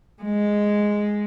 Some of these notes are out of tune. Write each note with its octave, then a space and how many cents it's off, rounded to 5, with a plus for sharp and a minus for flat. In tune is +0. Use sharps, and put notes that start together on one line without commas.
G#3 -5